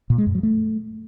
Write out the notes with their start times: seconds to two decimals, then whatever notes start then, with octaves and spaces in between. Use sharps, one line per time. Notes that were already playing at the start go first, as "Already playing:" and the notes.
0.10 A#2
0.18 G#3
0.26 F#2
0.35 F#3
0.43 A3